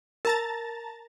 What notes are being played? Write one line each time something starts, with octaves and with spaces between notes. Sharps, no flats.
A#4 A5 A#5 A6